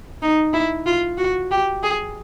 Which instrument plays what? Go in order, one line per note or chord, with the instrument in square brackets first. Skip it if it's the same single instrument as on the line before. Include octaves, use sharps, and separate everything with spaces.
[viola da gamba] D#4
E4
F4
F#4
G4
G#4